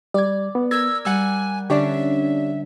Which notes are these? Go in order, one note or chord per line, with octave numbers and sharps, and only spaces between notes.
G3 D5 G#6
B3
A#4 E6 G#6
G3 F#5 G#5 E6
D3 C#4 D4 G4 C#5 D5 E5